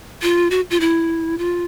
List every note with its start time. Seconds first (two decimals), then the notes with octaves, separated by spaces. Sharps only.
0.22 F4
0.51 F#4
0.71 F4
0.80 E4
1.38 F4